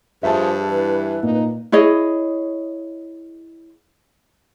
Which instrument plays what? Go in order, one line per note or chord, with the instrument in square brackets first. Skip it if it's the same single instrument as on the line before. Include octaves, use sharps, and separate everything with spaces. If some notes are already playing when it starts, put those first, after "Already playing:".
[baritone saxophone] G2 [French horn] F3 [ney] G#4 [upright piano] E5 A5
[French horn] E3 [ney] B4
[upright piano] A#2 [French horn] D#4
[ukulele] E4 G#4 C#5 D#5